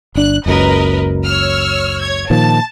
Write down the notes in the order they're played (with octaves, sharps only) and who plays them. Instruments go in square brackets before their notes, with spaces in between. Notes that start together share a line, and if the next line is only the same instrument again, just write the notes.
[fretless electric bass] G1 D4 [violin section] F#6
[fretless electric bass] F#1 C#2 F#2 [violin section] A#4 B4 D#5
[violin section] C#5 E6 F6
C#5 G#6
[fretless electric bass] A#2 D#3 F3 [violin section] A5